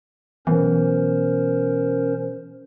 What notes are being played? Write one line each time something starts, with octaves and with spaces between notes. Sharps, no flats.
B2 E3 F#3 B3 C#4 A#4 C5